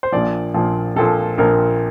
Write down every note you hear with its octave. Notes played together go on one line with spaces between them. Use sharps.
C5
A#1 A#2 F3 D5
A#1 A#2 F3
A#1 A#2 F3 A4
A#1 A#2 F3 A#4